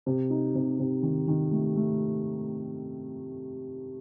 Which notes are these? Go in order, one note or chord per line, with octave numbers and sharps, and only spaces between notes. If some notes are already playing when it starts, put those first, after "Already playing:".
C3
D#4
C3
C3
D#3
D#3
A3
A3